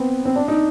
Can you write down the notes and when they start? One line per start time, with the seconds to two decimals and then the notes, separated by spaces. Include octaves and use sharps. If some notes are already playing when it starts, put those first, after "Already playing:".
Already playing: B3 C4
0.25 C4
0.36 D4
0.48 D#4